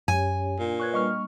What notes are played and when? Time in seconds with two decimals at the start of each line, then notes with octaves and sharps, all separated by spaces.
0.08 F#2 C#4 G4 C#5 G#5
0.59 A#2 D4
0.80 B4 C#5 C#6 F#6 G#6
0.93 G3 A#3 D4 D#5 C#6 F6